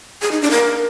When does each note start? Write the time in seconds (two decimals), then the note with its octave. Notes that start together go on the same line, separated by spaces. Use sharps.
0.22 G#4
0.32 D#4
0.41 D4
0.51 A#4